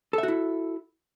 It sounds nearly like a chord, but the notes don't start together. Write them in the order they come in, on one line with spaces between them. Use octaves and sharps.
A4 E5 F#4 E4